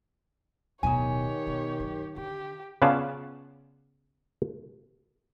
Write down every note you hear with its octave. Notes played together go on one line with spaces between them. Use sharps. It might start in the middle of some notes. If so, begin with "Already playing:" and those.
D1 B2 D#3 D#4 G4 C#5 G#5
B2
F#2
D3 G4
C#3 B3 C#4 F4 D5 A5